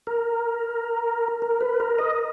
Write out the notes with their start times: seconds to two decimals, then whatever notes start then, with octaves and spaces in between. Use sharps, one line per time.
0.07 A#4
1.42 A#4
1.61 B4
1.80 A#4
1.98 D#5